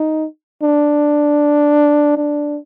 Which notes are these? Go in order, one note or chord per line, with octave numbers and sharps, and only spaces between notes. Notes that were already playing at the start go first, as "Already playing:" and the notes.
Already playing: D#4
D4
D4